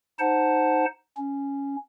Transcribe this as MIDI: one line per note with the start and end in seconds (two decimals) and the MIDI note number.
0.19 0.85 63
0.19 0.85 72
0.19 0.85 78
0.19 0.85 81
1.17 1.76 61